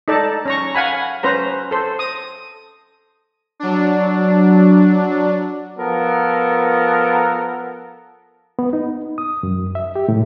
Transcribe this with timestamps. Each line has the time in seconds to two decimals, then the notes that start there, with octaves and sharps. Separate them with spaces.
0.08 D#4 A4 D5 A5
0.45 C#4 A#5 C#6
0.75 F5 F#5 G#5 B5
1.23 C#4 B4 C5 A#5
1.71 A4 C5
1.99 D#6
3.60 F#3 D4
5.78 F3 B3 A4 A#4
8.59 B3
8.73 D#4
9.18 D#6
9.43 F#2
9.75 E5
9.96 G4
10.09 A2